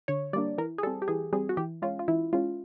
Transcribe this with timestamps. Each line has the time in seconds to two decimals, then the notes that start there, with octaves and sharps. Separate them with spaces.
0.08 D3 C#5
0.33 G3 D5
0.36 A#3 D4
0.58 E3 A#4
0.78 G#4
0.83 G3 A4
0.87 C4
1.02 G4
1.08 E3 G#4
1.33 G3 C4 G#4
1.49 F#4
1.57 E3 G4
1.82 G#3 C#4 F4
1.99 F4
2.08 E3 E4
2.33 G#3 C#4 F4